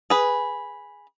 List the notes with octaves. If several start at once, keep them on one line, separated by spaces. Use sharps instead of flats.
G#4 B4